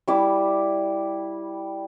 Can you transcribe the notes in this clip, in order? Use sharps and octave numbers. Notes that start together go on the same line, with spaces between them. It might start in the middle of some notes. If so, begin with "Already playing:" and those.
G3 E4 D6